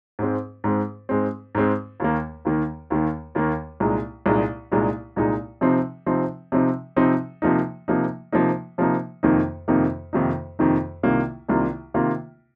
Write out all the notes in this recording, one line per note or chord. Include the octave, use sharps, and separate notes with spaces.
G#2 G#3 C4
G#2 G#3 C4
G#2 G#3 C4
G#2 G#3 C4
D#2 D#3 A#3
D#2 D#3 A#3
D#2 D#3 A#3
D#2 D#3 A#3
C2 A#2 G#3 D#4
C2 A#2 G#3 D#4
C2 A#2 G#3 D#4
C2 A#2 G#3 D#4
C3 F3 C4 D#4
C3 F3 C4 D#4
C3 F3 C4 D#4
C3 F3 C4 D#4
C3 F3 A#3 D#4
C3 F3 A#3 D#4
C3 F3 A#3 D#4
C3 F3 A#3 D#4
F2 C3 D#3 A#3 D#4
F2 C3 D#3 A#3 D#4
F2 C3 D#3 A#3 D#4
F2 C3 D#3 A#3 D#4
C2 C3 D#3 A#3 F4
C2 C3 D#3 A#3 F4
C3 D#3 A#3 F4